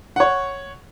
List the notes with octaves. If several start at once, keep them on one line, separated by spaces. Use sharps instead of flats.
C#5 F#5